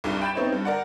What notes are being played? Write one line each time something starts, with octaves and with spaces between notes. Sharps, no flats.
C2 G2 G3
G5 B5 G6 A6 E7
B3 C4 D#4 E4 C#5
G2
A#4 D5 F#5